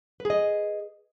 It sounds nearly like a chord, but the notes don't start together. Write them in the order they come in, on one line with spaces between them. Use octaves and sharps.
B4 G#4 D#5